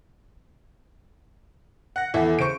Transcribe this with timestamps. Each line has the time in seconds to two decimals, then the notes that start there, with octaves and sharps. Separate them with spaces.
1.96 F#5 F#6 A#6
2.14 E2 E4 A4 E5
2.39 C#3 C5 C#6 D7